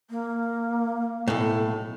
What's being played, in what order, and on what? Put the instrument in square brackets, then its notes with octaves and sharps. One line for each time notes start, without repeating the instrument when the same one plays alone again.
[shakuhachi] A#3
[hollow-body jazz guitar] B1 A2